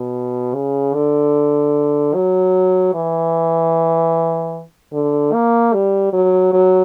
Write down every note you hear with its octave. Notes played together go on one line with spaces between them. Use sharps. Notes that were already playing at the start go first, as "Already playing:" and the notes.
Already playing: B2
C#3
D3
F#3
E3
D3
A#3
G3
F#3
F#3